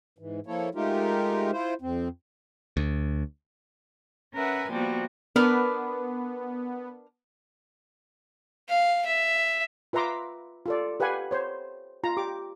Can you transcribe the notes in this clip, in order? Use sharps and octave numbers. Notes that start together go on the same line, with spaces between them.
G#2 E3
F3 A#3 E4 A4 C#5
G#3 A3 D#4 F4 G4 A#4
E4 F4 C5
F2 C4
D2
C#4 A#4 B4 E5 F#5 G#5
F3 G3 A#3 B3 F#4
B3 D4 A#4 B4
F5
E5
F4 B4 E5 A#5 C6 D6
F4 A4 D5
G4 B4 F5 F#5 G#5 B5
C5 C#5
F4 A#5
G4 D6